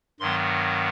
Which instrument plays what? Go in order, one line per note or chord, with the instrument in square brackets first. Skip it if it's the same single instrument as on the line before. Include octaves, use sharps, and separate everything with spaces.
[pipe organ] G2 D#3 F#3 B3 C6